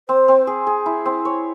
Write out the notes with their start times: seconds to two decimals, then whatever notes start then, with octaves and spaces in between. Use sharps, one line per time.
0.09 C4 C5
0.28 C4
0.47 G#4
0.67 G#4
0.86 E4
1.05 C4
1.25 C#5